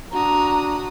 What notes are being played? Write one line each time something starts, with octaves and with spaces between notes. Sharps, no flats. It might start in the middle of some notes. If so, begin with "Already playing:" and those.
D4 F#4 A#5 D#6